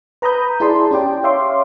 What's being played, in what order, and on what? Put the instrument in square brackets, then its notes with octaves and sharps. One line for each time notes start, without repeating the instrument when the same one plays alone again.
[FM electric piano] B4 A#5 B5 D#6 G6
E4 G#4 D5 A5 C6
C#4 G4 D5 G5
C#5 E5 F5 C6 D6